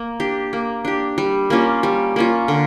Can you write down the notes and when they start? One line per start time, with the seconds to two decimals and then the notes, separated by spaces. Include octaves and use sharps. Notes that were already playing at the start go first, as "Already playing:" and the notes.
Already playing: A#3
0.20 D4 G4
0.53 A#3
0.85 D4 G4
1.18 G3
1.50 A#3 C#4 F4
1.83 G3
2.16 A#3 C#4 F4
2.48 D3